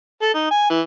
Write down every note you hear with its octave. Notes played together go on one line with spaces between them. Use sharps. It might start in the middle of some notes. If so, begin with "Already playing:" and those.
A4
D#4
G#5
E3